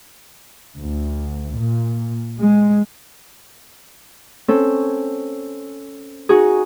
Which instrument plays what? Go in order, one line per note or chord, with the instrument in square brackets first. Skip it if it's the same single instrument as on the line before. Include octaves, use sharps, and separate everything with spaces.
[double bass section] D2
A#2
G#3
[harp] C4 C#4 A4
D#4 F#4 G#4